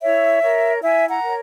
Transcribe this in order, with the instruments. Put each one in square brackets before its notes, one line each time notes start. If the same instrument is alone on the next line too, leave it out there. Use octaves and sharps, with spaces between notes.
[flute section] E4 C#5 E5
A#4 C#5
E4 E5 G#5
F#5 A#5
A#4 C#5